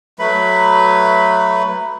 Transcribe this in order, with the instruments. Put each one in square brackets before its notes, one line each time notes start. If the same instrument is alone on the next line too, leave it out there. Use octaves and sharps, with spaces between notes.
[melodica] F#3 A3 B4 B5